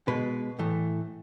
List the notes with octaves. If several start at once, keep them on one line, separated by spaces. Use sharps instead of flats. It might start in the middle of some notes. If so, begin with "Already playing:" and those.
B2 G#3 B4
A2 E3 A3